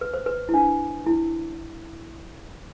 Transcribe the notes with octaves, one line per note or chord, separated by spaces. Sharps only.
B4
C5
B4
E4
D4
E4